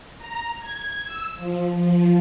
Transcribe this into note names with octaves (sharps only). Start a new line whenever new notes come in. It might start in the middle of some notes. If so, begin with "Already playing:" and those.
A#5
G#6
E6
F3
F3